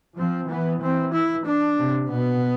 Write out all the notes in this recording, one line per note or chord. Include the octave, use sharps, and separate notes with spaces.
F3 C4
E3 B3
E3 C4
E4
D4
C3
B2 B3